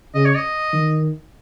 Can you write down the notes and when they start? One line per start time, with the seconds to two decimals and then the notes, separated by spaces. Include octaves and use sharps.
0.15 C#3 D#5
0.25 C#5
0.35 D#5
0.73 D#3